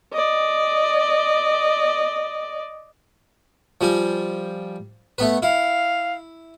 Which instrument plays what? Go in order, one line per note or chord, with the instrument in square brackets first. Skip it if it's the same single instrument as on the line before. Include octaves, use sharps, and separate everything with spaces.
[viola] D5 D#5
[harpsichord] F3 G3 G#5
A3 B3 B4
[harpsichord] E4 [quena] F5